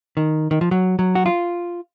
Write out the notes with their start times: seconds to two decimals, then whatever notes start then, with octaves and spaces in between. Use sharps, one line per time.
0.17 D#3
0.51 D#3
0.61 F3
0.71 F#3
0.99 F#3
1.15 F#4
1.26 F4